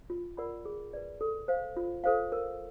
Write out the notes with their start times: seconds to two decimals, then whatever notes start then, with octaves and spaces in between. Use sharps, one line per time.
0.10 F4
0.37 A#4 D5 F#5 B5
0.65 G#4
0.93 B4 D5
1.21 A4
1.48 C5 F5
1.77 F4
2.04 A4 C5 F5
2.32 A#4